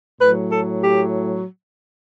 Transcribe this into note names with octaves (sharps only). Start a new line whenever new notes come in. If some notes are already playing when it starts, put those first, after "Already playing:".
A2 F#3 B4
A4
G4